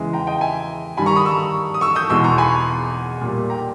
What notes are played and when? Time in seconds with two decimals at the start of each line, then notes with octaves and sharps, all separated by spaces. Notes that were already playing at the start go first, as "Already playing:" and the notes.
Already playing: E2 C#3 E3 G#3
0.13 G5 A#5
0.27 D#5 G5
0.41 E5 G#5
0.97 G2 D#3 G3 G#5 B5
1.06 A#5 C#6
1.16 B5 D#6
1.25 C#6 E6
1.74 D#6
1.81 C#6 E6
1.96 D#6 G6
2.10 E2 B2 G#3 C#6 E6
2.24 A#5 C#6
2.38 G#5 B5
3.21 A#2 G3
3.50 G5 A#5